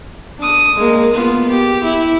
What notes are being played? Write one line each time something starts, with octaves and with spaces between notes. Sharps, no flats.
D4 D#6
G#3 A#3
B3 F4
G4
E4